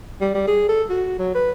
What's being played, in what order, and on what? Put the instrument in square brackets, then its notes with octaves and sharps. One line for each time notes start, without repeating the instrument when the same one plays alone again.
[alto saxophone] G3
G3
G#4
A4
F#4
F#3
B4